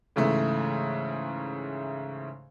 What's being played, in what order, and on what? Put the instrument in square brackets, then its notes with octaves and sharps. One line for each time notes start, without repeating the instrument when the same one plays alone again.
[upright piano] G#2 C#3 E3 A3